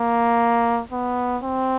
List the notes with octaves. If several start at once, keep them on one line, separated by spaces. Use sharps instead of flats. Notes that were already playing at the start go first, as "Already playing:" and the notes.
Already playing: A#3
B3
C4